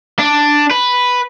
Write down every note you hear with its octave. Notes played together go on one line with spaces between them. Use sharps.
D4
B4